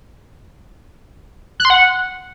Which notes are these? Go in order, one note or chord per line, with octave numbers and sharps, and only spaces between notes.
F#6
C6
F#5